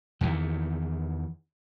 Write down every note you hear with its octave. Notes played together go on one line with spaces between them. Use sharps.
E2 D#3 E3